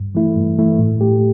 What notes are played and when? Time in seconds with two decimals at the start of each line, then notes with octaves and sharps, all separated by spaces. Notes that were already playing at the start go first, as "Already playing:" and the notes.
Already playing: G2
0.15 E3 A3 E4
0.36 G2
0.58 E3 A3 E4
0.79 A2
1.01 A3 G4